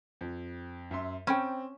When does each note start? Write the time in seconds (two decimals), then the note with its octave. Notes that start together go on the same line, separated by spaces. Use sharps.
0.21 F2
0.91 F#2 E5 C6
1.27 C4 C#4 G5 B5